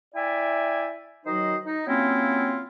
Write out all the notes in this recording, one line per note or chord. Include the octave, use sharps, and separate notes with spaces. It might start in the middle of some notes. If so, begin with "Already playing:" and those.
E4 D5 E5 G5 G#5
D#3 F#3 D#4 F#4 C5 D#5
D#4
F#3 A#3 C4 C#4 E4 F4